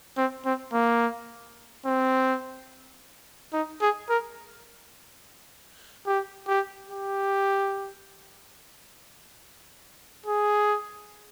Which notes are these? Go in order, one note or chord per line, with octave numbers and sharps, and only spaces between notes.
C4
C4
A#3
C4
D#4
G#4
A#4
G4
G4
G4
G#4